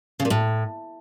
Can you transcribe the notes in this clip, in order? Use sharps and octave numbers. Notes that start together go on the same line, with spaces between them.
C#3
A#2
A2